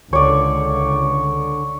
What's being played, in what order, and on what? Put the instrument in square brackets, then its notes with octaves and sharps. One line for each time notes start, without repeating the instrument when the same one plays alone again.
[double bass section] C#2 [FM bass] D3 [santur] C#5 D5